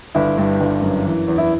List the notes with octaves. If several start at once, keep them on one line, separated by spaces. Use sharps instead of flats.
G1 E4
G2
G1
F#2
E3
E2
E4